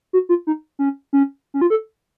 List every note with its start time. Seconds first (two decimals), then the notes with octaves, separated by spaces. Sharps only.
0.13 F#4
0.29 F4
0.47 D#4
0.79 C#4
1.13 C#4
1.54 C#4
1.61 F4
1.70 A4